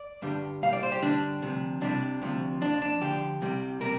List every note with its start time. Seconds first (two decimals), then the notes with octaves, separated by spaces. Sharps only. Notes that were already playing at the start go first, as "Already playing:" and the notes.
Already playing: D5
0.22 G2 D3 G3
0.63 C2 A#2 G3 F5
0.73 D5
0.83 C5
0.92 G4
1.02 G2 D3 G3 D4
1.42 D2 C3 F3
1.81 C2 C3 G3 D4
2.22 D2 C3 F3
2.61 F2 F3 D4
2.82 D4
3.01 D2 D3 F3 G4
3.41 C2 C3 G3
3.81 C3 G3 A#4